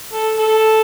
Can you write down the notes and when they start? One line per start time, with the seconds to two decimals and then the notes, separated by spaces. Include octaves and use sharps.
0.13 A4
0.38 A4